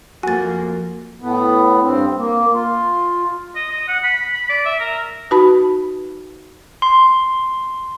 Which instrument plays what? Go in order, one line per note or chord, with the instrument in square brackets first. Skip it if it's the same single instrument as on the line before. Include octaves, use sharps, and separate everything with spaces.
[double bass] F2 [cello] A#3 [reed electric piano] F#4 [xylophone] G#5 A6
[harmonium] A2 B3
G2 C4
A#3
F4
[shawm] D#5
D#5
F#5
B5
B5
D5
E5
A#4
[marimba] D#4 F#4 B4 A5 B5
[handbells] C6